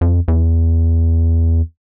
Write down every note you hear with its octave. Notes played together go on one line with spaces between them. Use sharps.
F2
E2